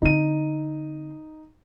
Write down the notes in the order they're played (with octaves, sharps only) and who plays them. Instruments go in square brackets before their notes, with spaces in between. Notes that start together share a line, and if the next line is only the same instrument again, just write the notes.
[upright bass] D3 C4 [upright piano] D#4 D#7